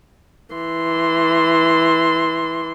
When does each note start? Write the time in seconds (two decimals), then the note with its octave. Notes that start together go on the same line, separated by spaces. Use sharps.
0.54 E3 C6